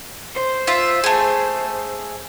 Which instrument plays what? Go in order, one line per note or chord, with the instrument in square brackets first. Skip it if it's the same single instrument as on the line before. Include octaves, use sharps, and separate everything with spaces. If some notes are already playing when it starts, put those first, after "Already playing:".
[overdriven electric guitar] C5
[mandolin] F4 E5
A3 G#4